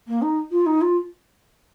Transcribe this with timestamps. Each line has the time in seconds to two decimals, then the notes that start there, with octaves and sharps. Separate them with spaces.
0.07 A#3
0.22 D#4
0.51 F4
0.66 D#4
0.81 F4